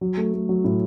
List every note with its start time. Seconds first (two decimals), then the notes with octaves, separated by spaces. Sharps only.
0.01 F#3
0.17 A3
0.33 A3
0.49 F#3
0.64 A2